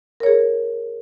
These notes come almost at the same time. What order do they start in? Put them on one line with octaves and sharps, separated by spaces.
A#4 C#5 G#4